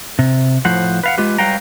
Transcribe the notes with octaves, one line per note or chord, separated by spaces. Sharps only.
C3
A2 F3 C5 F#5
B4 F5 F#5
G#3 F4 G4 B4
F#3 G3 B4 F5 G5 A#5